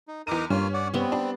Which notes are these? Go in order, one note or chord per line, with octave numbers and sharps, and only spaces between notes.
D#4
E2 D#4 A#4 A#5 D6 D#7
G2 A#3 C#4 F4 F6
D5 F#5
G3 B3 C4
D4